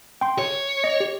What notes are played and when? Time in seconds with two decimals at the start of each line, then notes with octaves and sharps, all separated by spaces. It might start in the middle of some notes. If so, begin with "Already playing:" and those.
0.21 G5 C6
0.39 C#5
0.84 D#5
1.00 G4